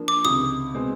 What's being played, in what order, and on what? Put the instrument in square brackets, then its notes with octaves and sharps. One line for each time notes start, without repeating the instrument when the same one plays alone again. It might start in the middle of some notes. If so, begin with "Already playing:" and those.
Already playing: [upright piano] F3 A#3 D4
[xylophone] D6
[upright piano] C#2 C3 D#3 [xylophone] D#6
[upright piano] B2 G#3 C4